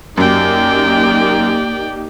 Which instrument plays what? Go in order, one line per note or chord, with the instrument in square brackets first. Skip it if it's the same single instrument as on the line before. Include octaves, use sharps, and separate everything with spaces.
[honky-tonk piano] F#2 [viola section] A#3 D#4 G4 [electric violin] D5 G5